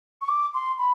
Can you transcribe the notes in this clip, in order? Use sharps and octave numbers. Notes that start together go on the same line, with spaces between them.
C#6
D6
C6
B5